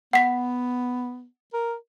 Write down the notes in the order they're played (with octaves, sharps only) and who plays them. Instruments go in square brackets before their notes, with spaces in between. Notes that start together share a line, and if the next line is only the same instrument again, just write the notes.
[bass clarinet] B3 [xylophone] F#5 B6
[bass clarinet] A#4